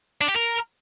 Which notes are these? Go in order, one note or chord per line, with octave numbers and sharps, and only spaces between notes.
D4
G4
A#4